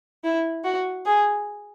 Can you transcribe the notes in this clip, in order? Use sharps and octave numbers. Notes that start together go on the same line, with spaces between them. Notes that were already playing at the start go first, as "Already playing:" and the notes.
E4
F#4
G#4